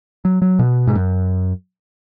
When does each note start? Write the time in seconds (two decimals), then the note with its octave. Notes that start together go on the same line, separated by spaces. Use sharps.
0.25 F#3
0.42 F#3
0.59 B2
0.87 G#2
0.95 F#2